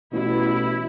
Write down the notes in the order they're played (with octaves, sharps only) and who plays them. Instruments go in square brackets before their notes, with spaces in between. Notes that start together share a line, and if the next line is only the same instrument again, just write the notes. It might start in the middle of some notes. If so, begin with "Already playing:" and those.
[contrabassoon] A1 [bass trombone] B2 [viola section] E4